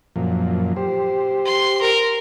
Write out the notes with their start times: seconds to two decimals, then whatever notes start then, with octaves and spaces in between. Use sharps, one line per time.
0.16 F#2 A#2 F3
0.76 G4 C5
1.45 C6
1.81 A#4